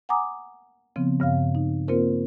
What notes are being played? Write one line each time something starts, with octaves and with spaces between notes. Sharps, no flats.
F#5 G#5 A#5 D6 D#6
C#3 F3 B3 C4
G2 C#3 F5
D#4
A#3 C4 F4 A#4 C5